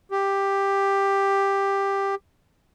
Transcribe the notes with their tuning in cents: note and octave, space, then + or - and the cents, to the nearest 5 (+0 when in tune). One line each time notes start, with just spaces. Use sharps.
G4 +10